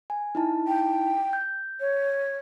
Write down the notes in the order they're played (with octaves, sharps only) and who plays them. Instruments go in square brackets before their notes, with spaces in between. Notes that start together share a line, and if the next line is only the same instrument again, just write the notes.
[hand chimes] G#5
D#4 E4 A5
[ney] G5
[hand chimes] G6
[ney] C#5